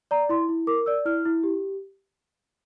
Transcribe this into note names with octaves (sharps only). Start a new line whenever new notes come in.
D5 A#5
E4 C6
E4
A#4 D6
D5 E6
E4 F6
E4
G4